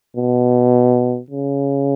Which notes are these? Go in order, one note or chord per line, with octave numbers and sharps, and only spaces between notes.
B2
C#3